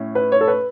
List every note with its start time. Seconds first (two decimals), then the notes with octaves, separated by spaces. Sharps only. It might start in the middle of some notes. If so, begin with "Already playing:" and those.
Already playing: A2 C#4 E4
0.15 B4
0.32 C#5
0.41 A4
0.48 B4